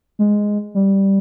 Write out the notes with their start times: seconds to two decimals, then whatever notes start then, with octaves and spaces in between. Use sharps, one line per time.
0.19 G#3
0.75 G3